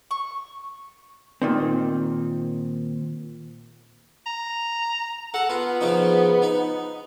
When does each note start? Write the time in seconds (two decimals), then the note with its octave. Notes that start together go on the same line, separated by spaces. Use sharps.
0.11 C#6
1.42 A#2 D#3 C4
4.26 A#5
5.34 A4 F#5
5.50 B3 F4
5.81 C#3 F3 D#4
6.42 D#4